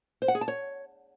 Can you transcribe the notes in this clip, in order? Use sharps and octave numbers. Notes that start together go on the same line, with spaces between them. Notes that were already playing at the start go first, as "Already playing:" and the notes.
C5
F#5
G#4
A5
C#5